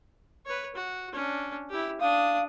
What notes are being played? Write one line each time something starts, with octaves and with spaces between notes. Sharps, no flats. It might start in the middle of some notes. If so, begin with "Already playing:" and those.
B4 C#5
F#4
C#4 D4
E4 G4
D4 F5 D#6